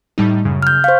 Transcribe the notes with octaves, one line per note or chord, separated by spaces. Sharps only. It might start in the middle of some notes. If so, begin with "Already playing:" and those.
A2 G3 D#4
F#2 C#3
F6 G6
C5 F5 C#6